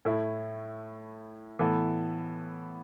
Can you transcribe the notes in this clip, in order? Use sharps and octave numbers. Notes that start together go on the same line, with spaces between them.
A2 A3 E4
A2 E3 B3 A4